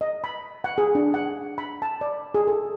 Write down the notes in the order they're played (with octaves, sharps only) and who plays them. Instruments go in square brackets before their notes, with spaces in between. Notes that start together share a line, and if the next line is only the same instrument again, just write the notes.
[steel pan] D#5
B5
F#5
G#4
D4
F#5
B5
A5
D5
G#4
A4